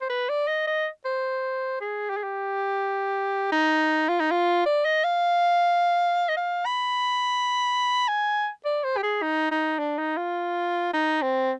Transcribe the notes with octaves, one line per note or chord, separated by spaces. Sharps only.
C5
B4
D5
D#5
D#5
C5
G#4
G4
G#4
G4
D#4
F4
D#4
F4
D5
D#5
F5
D#5
F5
B5
G#5
D5
C5
G4
G#4
D#4
D#4
D4
D#4
F4
D#4
C4